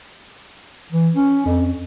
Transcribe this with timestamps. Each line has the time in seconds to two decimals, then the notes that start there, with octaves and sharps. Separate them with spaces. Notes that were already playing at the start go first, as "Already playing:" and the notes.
0.92 E3
1.15 C#4
1.46 F2